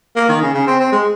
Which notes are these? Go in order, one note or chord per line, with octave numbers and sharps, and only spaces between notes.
A#3
D#3
C#3
C#3
C4
C4
G#3